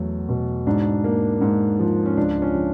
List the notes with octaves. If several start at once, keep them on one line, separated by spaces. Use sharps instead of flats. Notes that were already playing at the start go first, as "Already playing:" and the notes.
Already playing: E2 F#3 A3
B2
G#2 D4
A#3
G#2
F3
C#4
C#2 D4
C#4
F3